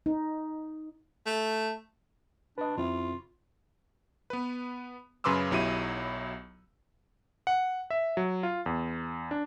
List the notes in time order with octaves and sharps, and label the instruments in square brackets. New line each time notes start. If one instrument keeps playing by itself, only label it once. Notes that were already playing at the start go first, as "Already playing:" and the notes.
[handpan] D#4
[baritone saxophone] A3
[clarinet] D4 [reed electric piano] B4 D#5
[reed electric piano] F2 C4 E4 [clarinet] F4
[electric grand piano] B3 B4
F#2 C#3 B4 C6 D6 E6
B1 F#3 E4 G4 D#7
F#5
E5
F#3
F4
E2
D4